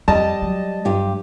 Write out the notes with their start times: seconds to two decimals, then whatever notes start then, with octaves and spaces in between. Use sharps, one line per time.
0.08 F2 G3 D#5 A5
0.42 F#3
0.85 G2 G4